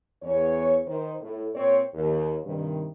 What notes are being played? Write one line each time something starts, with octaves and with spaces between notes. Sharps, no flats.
E2 C#5
D#3 C5
A2
A#2 C4 C5 C#5
D#2
G2 C3 D#3